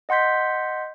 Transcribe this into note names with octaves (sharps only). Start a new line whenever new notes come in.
D#5 F#5 C6 G6 B6